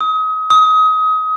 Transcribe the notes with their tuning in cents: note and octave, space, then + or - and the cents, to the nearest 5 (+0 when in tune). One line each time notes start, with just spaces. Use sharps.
D#6 +30
D#6 +25